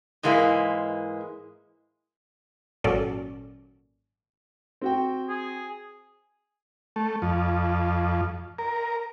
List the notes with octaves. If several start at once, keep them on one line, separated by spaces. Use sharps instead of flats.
G#2 E3 G#3 A#3 E4
G#1 A#2 F#3 C#4 A4 D5
C4 F#4 G5
G#4
A3
F2
A#4